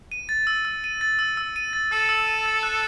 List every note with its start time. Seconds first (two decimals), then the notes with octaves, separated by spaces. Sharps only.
0.12 D#7
0.29 A6
0.47 E6
0.65 E6
0.84 D#7
1.01 A6
1.19 E6
1.37 E6
1.56 D#7
1.73 A6
1.91 A4 E6
2.09 E6
2.27 D#7
2.46 A6
2.63 F#6